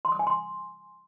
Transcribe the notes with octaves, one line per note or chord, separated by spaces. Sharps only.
C6
D#6
G#5
C6